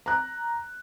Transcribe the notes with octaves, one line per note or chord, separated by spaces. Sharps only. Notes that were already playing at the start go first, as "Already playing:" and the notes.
A#5 F#6